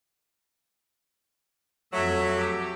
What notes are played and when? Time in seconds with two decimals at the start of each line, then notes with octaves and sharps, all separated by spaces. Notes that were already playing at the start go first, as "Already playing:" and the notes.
1.93 F2 F#3 A3 E5
2.36 G4